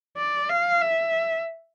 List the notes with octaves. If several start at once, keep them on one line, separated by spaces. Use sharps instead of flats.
D5
F5
E5